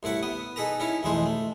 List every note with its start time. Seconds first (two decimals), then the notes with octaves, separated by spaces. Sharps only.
0.03 C2 A2 E4 F#5 C#6
0.23 B3 D#6
0.56 D#4 G#4 A4 B4 A#5
0.80 C#4 D#4 E4 C#5
1.03 B1 F2 E3 G#3 A3 C5
1.26 A3